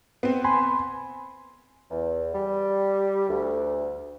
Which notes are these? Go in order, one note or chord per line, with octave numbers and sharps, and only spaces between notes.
B3 C4
G#5 B5 C6
E2
G3
D2